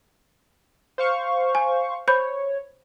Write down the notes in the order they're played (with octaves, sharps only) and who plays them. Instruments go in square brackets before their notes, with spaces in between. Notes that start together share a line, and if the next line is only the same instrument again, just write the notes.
[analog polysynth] C5 F5 C#6
[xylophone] G#5
[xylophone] C5 B5 G6 [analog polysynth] C#5